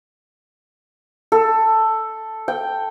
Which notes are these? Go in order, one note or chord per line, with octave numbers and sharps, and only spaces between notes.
A4
G5